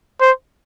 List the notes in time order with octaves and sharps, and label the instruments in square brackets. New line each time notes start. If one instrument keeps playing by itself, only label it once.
[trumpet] C5